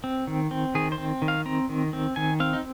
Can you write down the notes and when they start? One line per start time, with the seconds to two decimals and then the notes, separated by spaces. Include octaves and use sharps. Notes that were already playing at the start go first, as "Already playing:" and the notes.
0.04 C4
0.27 D#3
0.51 C4
0.75 D#3 G#4
0.92 C5
0.98 C4
1.22 D#3
1.28 F5
1.46 C4 A#5
1.69 D#3
1.93 C4
2.16 D#3 G#5
2.40 C4 F5
2.53 D#4